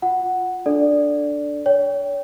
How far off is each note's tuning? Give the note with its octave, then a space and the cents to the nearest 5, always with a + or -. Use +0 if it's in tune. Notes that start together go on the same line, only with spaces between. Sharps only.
F4 +20 F#5 +0
D4 +0 A4 +0 D5 +0
C#5 +30 G5 +0